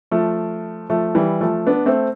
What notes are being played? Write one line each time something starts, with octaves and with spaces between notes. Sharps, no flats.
F3 A3
F3 A3
E3 G3
F3 A3
B3 D4
A3 C4